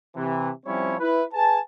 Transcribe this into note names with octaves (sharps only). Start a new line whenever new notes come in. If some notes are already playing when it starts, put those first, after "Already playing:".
C3 E3
F3 G3 C4 C#4 E4 C#5
E4 B4
G#4 B4 G#5 A5